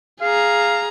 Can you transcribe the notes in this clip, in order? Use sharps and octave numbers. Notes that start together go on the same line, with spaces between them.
G#4 F5 A#5